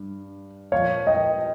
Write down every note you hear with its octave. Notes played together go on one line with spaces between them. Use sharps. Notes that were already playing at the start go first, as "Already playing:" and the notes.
Already playing: G2
A#2 F3 C#5 F5
D#5 G5